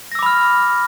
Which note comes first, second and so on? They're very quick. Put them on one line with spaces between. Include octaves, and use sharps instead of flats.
A#6 E6 D6 B5 F6